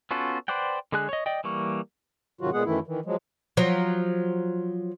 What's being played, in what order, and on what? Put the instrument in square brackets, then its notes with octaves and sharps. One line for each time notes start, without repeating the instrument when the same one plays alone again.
[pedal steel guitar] B3 C#4 F4 F#4 A4
B4 C5 D5 F#5 G5
D3 G#3 G#4 G#5 F#6
C#5 D#5
D5 D#5 G5
E3 G3 A#3 C#6
[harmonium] G#2 C3 D#3 F#3 F4 F#4
A#2 G#3 B3 G#4 F#5
F#2 D#3 E3 A3 E4
D#3 E3
F3 F#3 G#3
[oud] F3 F#3